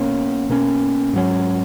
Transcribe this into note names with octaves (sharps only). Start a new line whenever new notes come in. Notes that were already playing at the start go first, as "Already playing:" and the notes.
Already playing: B2 A#3 C#4
B2 A#3 C#4
G#2 F#3 C#4